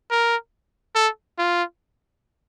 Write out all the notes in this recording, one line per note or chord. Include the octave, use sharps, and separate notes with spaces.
A#4
A4
F4